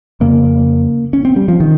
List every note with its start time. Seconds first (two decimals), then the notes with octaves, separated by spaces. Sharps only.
0.20 F2 C#3 A#3
1.13 C#4
1.25 C4
1.36 G3
1.48 F3
1.60 D#3